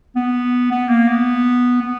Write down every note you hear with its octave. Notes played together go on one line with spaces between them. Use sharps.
B3
B3
A#3
B3
B3